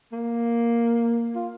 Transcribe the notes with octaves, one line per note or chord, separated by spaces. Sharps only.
A#3
F4